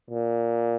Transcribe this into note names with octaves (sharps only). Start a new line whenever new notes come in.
A#2